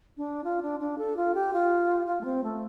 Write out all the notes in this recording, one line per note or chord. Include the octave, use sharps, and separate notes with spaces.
D4
F4
D4
D4
A4
F4
G4
F4
F4
A3
C4
A3